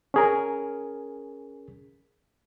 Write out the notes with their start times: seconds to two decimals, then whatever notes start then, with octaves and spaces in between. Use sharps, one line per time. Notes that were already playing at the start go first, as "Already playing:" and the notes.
0.14 C#4 G#4 A#4